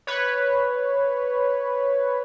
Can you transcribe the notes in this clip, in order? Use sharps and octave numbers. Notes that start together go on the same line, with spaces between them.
B4 C#5